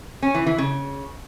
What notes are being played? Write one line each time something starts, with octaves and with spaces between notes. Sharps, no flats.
C#4
E3
E3
C#3